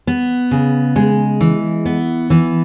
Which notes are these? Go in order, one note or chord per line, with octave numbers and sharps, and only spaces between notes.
B3
C#3
G#3
E3
B3
E3